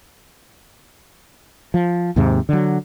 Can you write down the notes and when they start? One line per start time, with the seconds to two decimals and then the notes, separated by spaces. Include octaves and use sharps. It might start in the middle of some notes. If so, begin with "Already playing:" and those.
1.74 F3
2.16 D#2 G#2 C3
2.49 D3 F#3